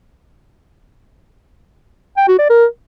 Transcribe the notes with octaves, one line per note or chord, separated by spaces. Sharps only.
G5
F#4
D5
A#4